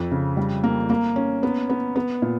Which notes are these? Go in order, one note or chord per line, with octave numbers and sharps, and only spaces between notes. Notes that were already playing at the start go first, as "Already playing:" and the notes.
Already playing: F2
C#3
G3
A#3
A#3
C#4
B3
B3
B3
A#2